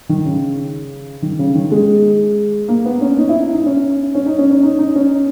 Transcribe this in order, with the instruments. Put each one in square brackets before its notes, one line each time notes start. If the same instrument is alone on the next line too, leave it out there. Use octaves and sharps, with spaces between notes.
[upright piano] D#3
C#3
D#3
C#3
D#3
G#3
A#3
B3
C#4
D#4
E4
D#4
C#4
C#4
D#4
C#4
C#4
D#4
D#4
C#4